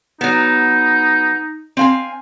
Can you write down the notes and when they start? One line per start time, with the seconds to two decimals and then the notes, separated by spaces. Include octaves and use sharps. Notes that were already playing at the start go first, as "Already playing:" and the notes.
0.21 F#3 B3 D#4
1.77 C4 F5 G#5